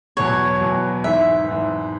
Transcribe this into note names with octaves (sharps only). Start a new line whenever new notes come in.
E2 B2 F#3 C#5
E2 B2 F#3
G#1 G#2 E3 E5
G#1 G#2 E3